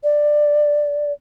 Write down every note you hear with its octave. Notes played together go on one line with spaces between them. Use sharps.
D5